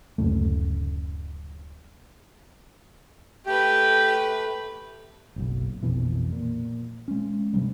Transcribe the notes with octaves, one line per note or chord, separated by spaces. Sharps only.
D1 F#2 C#3 A3
A3 G4 B4
F#1 B1
A#1 F2 B2 E3
A#2
G#3 C#4
G2 C3 F#3 G3